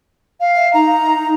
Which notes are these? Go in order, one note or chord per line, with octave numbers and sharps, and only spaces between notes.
F5
E5
D#4 A#5